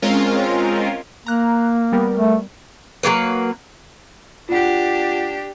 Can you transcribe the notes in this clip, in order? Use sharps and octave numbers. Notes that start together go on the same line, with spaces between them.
G#3 C4 C#4 F4 A#4
A#3 A#5 F#6
G3 B3 A#4
A3
F#3 G#3 A#3 B4
D4 F4 G4 F#5